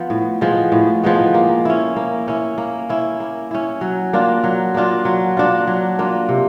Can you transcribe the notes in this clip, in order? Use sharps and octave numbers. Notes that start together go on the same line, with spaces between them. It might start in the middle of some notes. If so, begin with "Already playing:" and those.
Already playing: F3 B3
A2
F3 G#3 B3
A2
F3 G#3 B3
A#3
C#4 E4
A#3
C#4 E4
A#3
C#4 E4
A#3
C#4 E4
F#3
A#3 D4 F4
F#3
A#3 D4 F4
F#3
A#3 D4 F4
F#3
A#3 D4 F4
C3